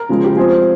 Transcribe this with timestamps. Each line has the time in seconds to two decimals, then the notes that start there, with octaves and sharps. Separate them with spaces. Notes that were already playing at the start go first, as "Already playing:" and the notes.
Already playing: A#4
0.09 C#3 F3 G#3
0.24 G4
0.36 F3 G#3 C4 G#4